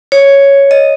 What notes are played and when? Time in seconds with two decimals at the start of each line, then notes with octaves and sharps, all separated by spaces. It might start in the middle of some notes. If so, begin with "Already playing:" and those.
0.12 C#5
0.71 D#5